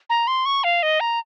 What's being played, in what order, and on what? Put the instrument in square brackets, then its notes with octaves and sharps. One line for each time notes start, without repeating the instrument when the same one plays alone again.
[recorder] A#5
C6
C#6
F5
D#5
A#5